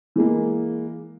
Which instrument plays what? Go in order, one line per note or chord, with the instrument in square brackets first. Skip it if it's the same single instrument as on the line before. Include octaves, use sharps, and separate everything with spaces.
[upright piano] E3 G#3 A#3